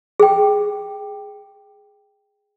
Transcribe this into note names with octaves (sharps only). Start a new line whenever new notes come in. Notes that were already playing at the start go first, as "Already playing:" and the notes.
G#4 G5